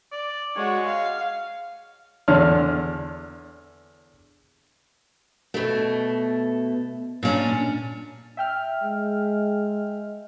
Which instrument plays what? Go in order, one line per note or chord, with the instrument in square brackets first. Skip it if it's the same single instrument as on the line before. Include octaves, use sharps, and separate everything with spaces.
[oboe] D5
[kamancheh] G#3 F#4 [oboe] C#5
[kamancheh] F5
[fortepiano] E2 D3 C#5 A5 C6 F6
[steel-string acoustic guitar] B2 A3
A#2 C#4 D4
[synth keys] E5 G5 F6
[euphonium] G#3